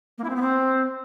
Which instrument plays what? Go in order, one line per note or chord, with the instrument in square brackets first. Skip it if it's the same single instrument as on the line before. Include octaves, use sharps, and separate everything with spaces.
[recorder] A#3
E4
C4
B3
C4